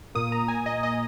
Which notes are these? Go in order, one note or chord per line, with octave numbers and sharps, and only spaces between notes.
A#2 A#3 D#6
A#5
G#5
D#5
D#5